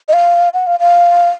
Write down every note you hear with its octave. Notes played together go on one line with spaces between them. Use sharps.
D#5
F5
F#5
F5
F5